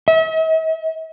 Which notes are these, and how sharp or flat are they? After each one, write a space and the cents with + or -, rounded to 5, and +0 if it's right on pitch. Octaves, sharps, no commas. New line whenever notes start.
E5 -45